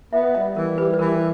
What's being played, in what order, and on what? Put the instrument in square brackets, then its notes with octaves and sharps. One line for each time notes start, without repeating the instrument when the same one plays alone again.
[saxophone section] B3 [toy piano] E5
[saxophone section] G3 [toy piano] D#5
[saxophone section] E3 [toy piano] A#4
[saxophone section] G3 [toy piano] B4
[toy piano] B4
[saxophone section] E3 [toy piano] A#4